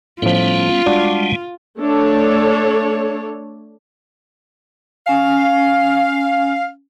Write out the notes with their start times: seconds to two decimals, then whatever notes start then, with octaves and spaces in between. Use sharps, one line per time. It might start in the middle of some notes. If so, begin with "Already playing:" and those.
0.22 A2 F3 G3 B3 C#4 F4
0.86 G3 G#3 D4 F#4 D5
1.79 A3 D4 A4 C#5
5.07 C#4 F5 G#5